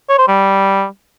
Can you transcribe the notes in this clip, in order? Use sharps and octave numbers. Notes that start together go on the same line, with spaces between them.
C#5
C5
G3